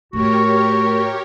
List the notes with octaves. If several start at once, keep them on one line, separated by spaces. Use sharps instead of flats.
A2 F#4 G4 A#4 C#5